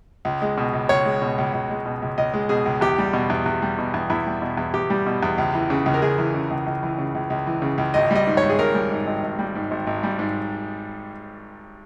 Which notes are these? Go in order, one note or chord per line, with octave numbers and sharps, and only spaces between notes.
C#2
G#3
B2
C#2
C#2 C#5
G#3
B2
C#2
C#2
G#3
B2
C#2
C#2 D#5
G#3
B2 G#4
C#2
E2 G4
G3
B2
E2
E2
G3
B2
E2
E2 E4
G3
B2
E2
E2 G4
G3
B2
E2
C#2
E3
C#3
C#2
A#4
C#2 G#4
E3
C#3
C#2
C#2
E3
C#3
C#2
C#2
E3
C#3
C#2
G#1 D#5
G3 D#5
G#2
C#5
G#1
G#4
G#1 A#4
G3
G#2
G#1
G#1
G3
G#2
G#1
G#1
G3
G#2